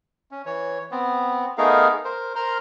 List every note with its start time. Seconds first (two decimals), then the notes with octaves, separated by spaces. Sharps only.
0.31 C#4
0.46 E3 C#5
0.91 B3 C4
1.58 A3 B3 D#4 G#4 A#4 F5
2.04 A#4 C5
2.36 A#4 C5 A#5 C6 F6